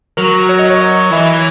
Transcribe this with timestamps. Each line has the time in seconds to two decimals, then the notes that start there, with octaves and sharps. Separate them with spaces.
0.17 F#3 A#4
0.49 C#5
0.59 D#5
0.70 C#5
0.81 D#5
1.12 E3 E5